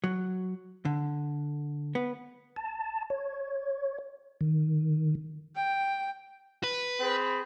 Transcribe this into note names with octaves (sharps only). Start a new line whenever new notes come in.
F#3
D3
B3
A5
C#5
D#3
G5
B4
C4 G#4 B5